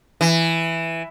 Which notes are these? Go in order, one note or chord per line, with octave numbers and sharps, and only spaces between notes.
E3